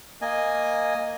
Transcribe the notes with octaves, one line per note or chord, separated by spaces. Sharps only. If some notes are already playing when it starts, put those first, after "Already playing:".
A#3 D#5 G#5